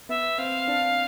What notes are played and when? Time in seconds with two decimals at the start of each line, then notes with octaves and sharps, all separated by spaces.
0.09 B3 E5
0.38 C4 F5
0.68 D4